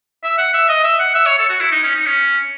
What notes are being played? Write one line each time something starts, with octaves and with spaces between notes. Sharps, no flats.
E5
F#5
E5
D#5
E5
F#5
E5
C#5
A4
F#4
E4
D#4
C#4
D#4
C#4